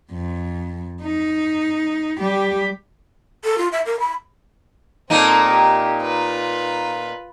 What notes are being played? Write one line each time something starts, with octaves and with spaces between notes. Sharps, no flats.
F2
D#4
G3 G4
A4
F4
E5
A#4
B5
A#2 A#3 C4 D#4 A4
G4
F4 B4